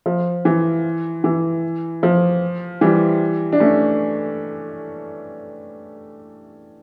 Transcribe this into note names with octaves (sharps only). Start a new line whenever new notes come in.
F3
E3
E3
F3
E3 G3
D4
A3 C#4